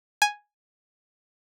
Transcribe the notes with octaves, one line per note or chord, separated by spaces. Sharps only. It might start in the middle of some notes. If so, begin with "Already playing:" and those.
G#5